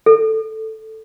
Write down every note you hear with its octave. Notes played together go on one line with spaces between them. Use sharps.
A4